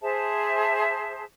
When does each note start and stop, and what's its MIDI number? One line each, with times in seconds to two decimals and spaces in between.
0.02 1.24 68
0.02 1.24 72
0.02 1.24 76
0.02 1.24 81